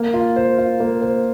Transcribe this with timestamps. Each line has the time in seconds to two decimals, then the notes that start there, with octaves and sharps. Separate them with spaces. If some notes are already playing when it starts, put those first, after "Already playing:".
Already playing: A#3
0.14 F4
0.36 C5
0.58 F4
0.80 A#3
1.02 C5